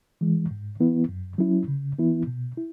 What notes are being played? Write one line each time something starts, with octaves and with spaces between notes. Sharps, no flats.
E3 G#3
G#2
E3 B3 E4
F#2
F#3 C#4 E4
C#3
E3 B3 E4
B2
E4